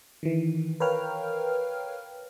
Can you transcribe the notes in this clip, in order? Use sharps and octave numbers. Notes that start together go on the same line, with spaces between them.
D#3 E3
A#4 B4 C#5 F5 G5 F6